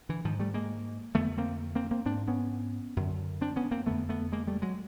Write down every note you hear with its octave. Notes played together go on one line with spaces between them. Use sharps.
D3 E3
G#2 D#3 F3
G3 A3
G#3 A#3
F2 D3 A3 B3
A#3 C4
A#3 C4
A#3 C4
G#2 C4 D4
B3 C#4
F#2 D3
C4 D4
B3 C#4
A#3 C4
F2 D3 A3 B3
A3 B3
G#3 A#3
G3 A3
F#3 G#3